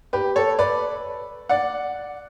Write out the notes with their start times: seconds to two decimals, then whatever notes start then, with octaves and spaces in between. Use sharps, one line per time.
0.13 G4 B4
0.36 A4 C#5
0.59 B4 D5
1.49 D5 F#5